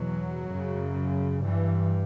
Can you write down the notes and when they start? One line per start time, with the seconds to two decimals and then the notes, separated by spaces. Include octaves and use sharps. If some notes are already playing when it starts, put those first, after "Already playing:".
Already playing: E2 B2 F#3
0.49 F#2 C#3
1.42 G2 E3